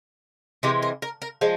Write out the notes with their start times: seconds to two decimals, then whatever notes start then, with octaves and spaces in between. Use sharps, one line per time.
0.63 C3 E3 G#3 G4
0.82 A#4
1.02 A#4
1.22 A#4
1.41 F3 G#3